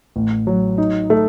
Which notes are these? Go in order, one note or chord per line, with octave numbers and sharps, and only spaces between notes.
A1
F#3
D#4
A3